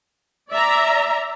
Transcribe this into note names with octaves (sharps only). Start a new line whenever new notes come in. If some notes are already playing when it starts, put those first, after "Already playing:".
D5 E5 A#5